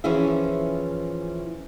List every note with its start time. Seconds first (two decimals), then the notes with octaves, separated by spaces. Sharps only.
0.04 E3 F3 C#4 E4 G#4 E5